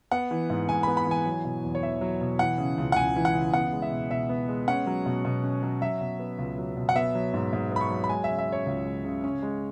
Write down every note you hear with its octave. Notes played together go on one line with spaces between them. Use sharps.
B3 F#5
E3
G#2
G#2 G#5
B3 B5
B5
E3 G#5
F#3
B2
E2
C#5
E2 E5
F#3
B2
E3 F#5
C#3
C#2
F#5
C#2 G#5
E3
F#5
C#3
B3 F#5
G#3
E5
B2
B2 E5
B3
G#3
C#4 F#5
F#3
B2
B2
C#4
F#3
F#3 E5
B2
B3
C#2
F#3
B2
F#5
B3 E5
F#3
G#2
G#2
B3 B5
C#6
F#3
B5
G#3 G#5
C#3 E5
E5
C#4 C#5
C#2
G#3
C#3
C#4
G#3